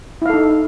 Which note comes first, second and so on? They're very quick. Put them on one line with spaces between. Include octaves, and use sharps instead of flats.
E4 F5 A4 D#4